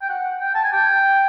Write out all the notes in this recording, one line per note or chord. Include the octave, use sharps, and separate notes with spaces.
G5
F#5
G5
A5
G#5
G5